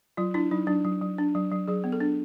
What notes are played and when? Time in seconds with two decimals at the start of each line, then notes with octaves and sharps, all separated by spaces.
0.17 F#3 F4
0.34 D4 E4
0.51 F#3 D#4
0.67 F#3 D4
0.85 F#3
1.02 F#3
1.18 D4
1.35 F#3
1.52 F#3
1.68 F#3 G#4
1.84 B3
1.92 A4
2.00 D4